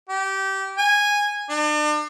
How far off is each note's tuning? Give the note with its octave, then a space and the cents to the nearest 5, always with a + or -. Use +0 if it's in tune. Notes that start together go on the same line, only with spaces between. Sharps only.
G4 -20
G#5 -10
D4 +40